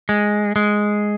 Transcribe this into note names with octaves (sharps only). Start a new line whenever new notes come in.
G#3
G#3